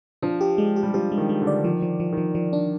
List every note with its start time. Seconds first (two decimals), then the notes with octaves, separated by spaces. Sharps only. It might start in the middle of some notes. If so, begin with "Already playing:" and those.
0.22 F3 D4
0.41 G4
0.58 G#3
0.76 G4
0.83 G3
0.94 F3 G4
1.12 G#3
1.18 D#3
1.29 G#3
1.42 D3
1.47 D5
1.64 D#3 F3
1.82 F3
2.00 F3
2.12 D#3
2.18 F3
2.35 F3
2.53 D4